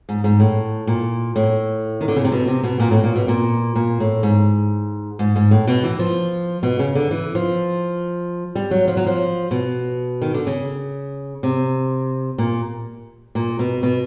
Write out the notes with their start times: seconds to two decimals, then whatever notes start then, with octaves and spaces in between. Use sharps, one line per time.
0.09 G#2
0.24 G#2
0.40 A2
0.87 A#2
1.36 A2
2.01 D#3
2.08 D3
2.16 C#3
2.24 C3
2.32 B2
2.47 C3
2.64 B2
2.80 A#2
2.91 A2
3.04 A#2
3.16 B2
3.28 A#2
3.75 A#2
4.00 A2
4.23 G#2
5.19 G#2
5.36 G#2
5.51 A2
5.67 B2
5.83 E3
5.99 F3
6.63 B2
6.79 C#3
6.95 D3
7.11 E3
7.35 F3
8.55 G3
8.71 F#3
8.88 F3
8.97 F#3
9.07 F3
9.51 B2
10.22 D#3
10.34 D3
10.47 C#3
11.43 C3
12.38 A#2
13.35 A#2
13.59 B2
13.83 B2